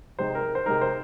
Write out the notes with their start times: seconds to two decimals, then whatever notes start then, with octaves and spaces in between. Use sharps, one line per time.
0.19 C3 G#3 D#4 C5
0.35 A#4
0.55 C5
0.66 C3 G#3 D#4 A#4
0.81 C5